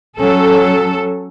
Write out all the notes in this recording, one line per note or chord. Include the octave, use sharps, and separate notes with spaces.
F#3 C#4 A4